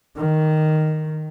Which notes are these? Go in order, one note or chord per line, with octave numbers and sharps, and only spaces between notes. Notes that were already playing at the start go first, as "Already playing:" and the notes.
D#3